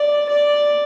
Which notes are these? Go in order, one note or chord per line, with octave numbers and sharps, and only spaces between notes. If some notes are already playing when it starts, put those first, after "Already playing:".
Already playing: D5
D5